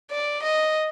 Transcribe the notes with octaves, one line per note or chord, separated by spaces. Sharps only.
D5
D#5